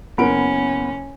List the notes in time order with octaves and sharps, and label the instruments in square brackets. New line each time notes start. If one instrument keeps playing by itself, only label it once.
[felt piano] F#1 A#4 D7 [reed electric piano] B3 F#5 B5 [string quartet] C#4